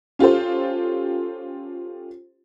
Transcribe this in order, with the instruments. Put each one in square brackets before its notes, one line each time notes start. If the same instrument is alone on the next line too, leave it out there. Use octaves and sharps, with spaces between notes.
[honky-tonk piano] C#4 F4 G4 A4 C5